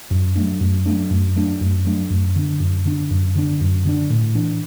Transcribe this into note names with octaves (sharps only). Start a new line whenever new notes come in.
F#2
F#3 A3 D4
F#2
F#3 A3 D4
F#2
F#3 A3 D4
F#2
F#3 A3 D4
F#2
D3 B3 D4
F#2
D3 B3 D4
F#2
D3 B3 D4
F#2
D3 B3 D4
A2
E3 D4